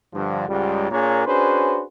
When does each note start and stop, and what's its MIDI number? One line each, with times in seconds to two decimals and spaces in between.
0.14 0.46 43
0.14 0.46 50
0.14 0.46 53
0.48 0.90 37
0.48 0.90 44
0.48 0.90 55
0.91 1.24 46
0.91 1.24 58
0.91 1.24 62
0.91 1.24 68
0.91 1.24 73
0.91 1.24 82
1.26 1.82 61
1.26 1.82 62
1.26 1.82 66
1.26 1.82 68
1.26 1.82 71
1.26 1.82 72